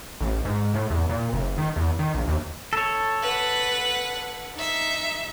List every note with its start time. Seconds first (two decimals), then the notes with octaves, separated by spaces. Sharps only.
0.21 A1
0.45 G#2
0.74 A2
0.90 E2
1.09 A#2
1.33 F#1
1.58 D#3
1.76 E2
1.99 D#3
2.14 A#1
2.28 D#2
2.73 A4 C#5
3.22 B4 F#5
4.55 D#4 E5